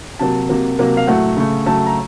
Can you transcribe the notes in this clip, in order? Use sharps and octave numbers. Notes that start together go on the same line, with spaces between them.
C3 F#3 A#3 A5
C3 F#3 A#3
C3 F#3 A#3
F5
A2 F#3 A3 F#5
C#3 A3
C#3 F#3 A3 A5
A#5